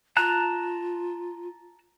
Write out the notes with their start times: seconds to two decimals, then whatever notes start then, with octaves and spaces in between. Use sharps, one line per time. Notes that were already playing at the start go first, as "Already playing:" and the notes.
0.17 F4 A5 A#5 F#6